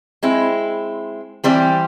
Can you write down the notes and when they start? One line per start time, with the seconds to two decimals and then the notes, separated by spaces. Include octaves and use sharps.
0.23 G#3 C4 E4
1.44 E3 G3 C4 G4 C5